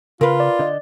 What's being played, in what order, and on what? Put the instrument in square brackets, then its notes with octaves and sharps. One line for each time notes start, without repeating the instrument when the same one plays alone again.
[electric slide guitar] C#3 [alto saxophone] F4 [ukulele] A#4 B4
[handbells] D5
[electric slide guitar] D3 D#5